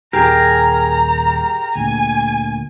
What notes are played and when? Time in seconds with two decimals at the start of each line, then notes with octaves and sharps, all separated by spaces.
0.13 D#1 G4 G#4 A#4 A#5
1.76 D2 A#2 G#5